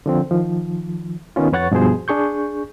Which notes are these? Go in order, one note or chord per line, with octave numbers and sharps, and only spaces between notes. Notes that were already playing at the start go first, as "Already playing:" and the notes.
D3 F3 C4
D#3 F3
D#3 B3 C#4 F4
F2 B4 C#5 F#5 C#6 A6
G2 B2 F3 G#4 C5
D4 G#4 C#6 G6